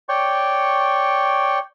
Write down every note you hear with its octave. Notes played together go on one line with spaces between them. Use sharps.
C#5 D5 G5 C#6